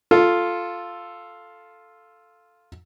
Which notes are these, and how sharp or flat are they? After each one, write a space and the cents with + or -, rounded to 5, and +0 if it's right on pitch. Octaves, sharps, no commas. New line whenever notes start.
F4 +0 A4 +0